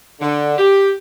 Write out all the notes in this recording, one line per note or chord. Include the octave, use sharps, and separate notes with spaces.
D3
G4